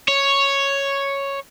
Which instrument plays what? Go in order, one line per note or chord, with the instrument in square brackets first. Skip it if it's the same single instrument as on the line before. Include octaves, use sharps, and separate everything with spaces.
[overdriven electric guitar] C#5